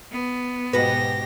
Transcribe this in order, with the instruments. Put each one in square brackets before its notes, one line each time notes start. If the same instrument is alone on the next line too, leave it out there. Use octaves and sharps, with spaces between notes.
[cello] B3
[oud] G#2 F#4 B4 [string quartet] B2 G4 A#6